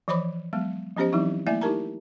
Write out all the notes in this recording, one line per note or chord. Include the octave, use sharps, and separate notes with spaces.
E3 F3 C5 C#5 B5 D6
F#3 G#3 B3
F3 B3 C#4 G4 C5 D#5
E3 F#3 C4 D#4 E4
A3 A#3 E4 D5 E5 G#5
D#4 E4 G4 A#4 A5 A#5